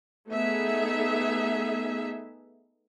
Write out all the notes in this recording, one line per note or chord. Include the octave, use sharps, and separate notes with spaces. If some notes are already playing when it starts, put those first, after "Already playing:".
A3 B3 D#4 G#4 E5